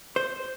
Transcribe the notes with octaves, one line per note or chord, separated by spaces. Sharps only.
C5